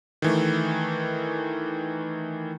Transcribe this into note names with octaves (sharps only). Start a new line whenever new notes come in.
D#3 E3 A3